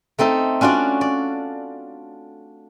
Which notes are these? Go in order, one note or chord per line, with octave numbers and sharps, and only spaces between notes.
A3 C4 D#4 A4
C#4 D4 F4 F#4 D5
D5